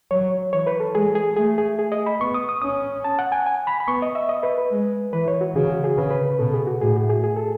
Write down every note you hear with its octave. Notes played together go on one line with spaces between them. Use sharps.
F#3 C#5
E3 C#5
B4
A4
G#3 G#4
G#4
A3 G#4
G#4
G#4
D#5
B5
B3 C#6
D#6
D#6
C#4 D#6
A5
F#5
G#5
G#5
B5
B5
B3 C#6
D#5
E5
D#5
B4
B4
G#3
E3 B4
C#5
F#4
C#3 G#4
F#4
G#4
C#3 B4
B4
B4
B2 A4
G#4
F#4
A2 G#4
F#4
G#4
G#4
A4